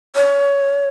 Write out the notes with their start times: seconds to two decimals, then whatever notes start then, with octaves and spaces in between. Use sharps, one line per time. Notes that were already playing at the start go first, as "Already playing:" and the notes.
0.16 C#5